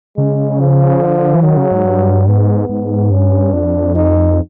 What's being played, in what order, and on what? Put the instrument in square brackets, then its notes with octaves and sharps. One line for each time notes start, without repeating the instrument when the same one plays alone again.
[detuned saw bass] C#3 [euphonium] G#3
[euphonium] F3
[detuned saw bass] D3
E3
[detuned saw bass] D#3 [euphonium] F#3
[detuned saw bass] C#3
G#2
G2
[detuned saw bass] G#2 [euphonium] B3
[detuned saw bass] G#2
[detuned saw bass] G2 [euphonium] C#4
[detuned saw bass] F2 [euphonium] D4
[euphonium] D#4